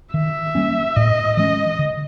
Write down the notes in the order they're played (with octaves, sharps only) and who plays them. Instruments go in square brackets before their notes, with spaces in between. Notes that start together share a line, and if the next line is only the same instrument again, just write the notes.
[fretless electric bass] D#3 [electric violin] E5
[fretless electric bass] G3 A#3 C#4
[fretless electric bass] A2 [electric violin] D#5
[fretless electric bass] E3 G#3 C#4 [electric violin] D#5
[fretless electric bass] D3